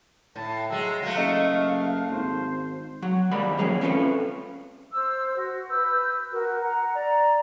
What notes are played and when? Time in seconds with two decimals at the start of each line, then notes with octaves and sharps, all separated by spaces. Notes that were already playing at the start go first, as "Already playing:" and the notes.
0.36 A2 A5
0.70 F#3 G#3 E6
1.02 F#3 A3 F5
1.17 F#1 D#5
2.11 G#1 C5
3.02 F#3 F#5
3.31 D#2 G3 G#3 A#3 D5 B5
3.58 F3 F#3 A#3 C#4 G#4 C#5
3.81 C4 C#4 F4 G4 A4 B4
4.93 C5 E6
5.36 F#4
5.70 B4 E6 G6
6.31 F#4 A#4
6.61 F#5 A#5
6.94 D5 A#5